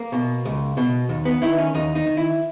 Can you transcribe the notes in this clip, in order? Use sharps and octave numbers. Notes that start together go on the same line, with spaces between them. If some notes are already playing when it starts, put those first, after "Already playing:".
Already playing: A#3
B2
C#2
B2
D#2
B3
D#3 E4
C#4
D#2 D#4
D#4
D#3
E4